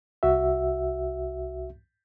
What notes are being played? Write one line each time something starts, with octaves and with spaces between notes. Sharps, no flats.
C2 F#4 E5